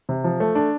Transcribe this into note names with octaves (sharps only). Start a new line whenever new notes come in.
C3
F3
A3
D4